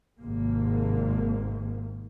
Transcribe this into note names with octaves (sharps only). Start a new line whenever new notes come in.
G#1 G#2 C3 A#3